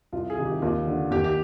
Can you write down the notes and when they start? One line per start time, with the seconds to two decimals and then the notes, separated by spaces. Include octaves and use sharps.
0.12 C2 F4
0.30 G#4
0.38 C3 D#3
0.46 G4
0.62 D#2 F4
0.87 D3
1.11 D#2 G4
1.24 G4